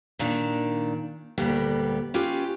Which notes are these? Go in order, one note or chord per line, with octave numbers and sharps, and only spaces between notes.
A#2 D#3 D4
D2 A#2 G3 B3 G5
C#4 F4 G4 B4